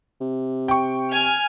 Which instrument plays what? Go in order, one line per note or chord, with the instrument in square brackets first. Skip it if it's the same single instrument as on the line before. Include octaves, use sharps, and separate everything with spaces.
[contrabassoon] C3
[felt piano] G5 C#6
[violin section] G#5 F6